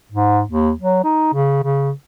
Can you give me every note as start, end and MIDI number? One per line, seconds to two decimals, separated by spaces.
0.12 0.42 44
0.50 0.72 39
0.80 1.03 54
1.04 1.33 63
1.33 1.63 49
1.64 1.91 49